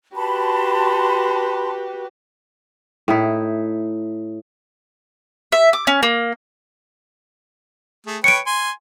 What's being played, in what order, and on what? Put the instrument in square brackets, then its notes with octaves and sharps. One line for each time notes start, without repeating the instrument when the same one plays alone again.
[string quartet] F#4 G4 B4 [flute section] A5 B5 C6
[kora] A2 D#4 E4
[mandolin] E5
D6
C#4
A#3
[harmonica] A3 G#4
[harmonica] B4 C#5 G5 [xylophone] C#7 D7
[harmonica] G#5 C6